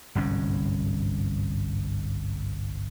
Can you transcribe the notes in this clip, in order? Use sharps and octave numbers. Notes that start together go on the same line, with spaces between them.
G1 C2 G#2 C#4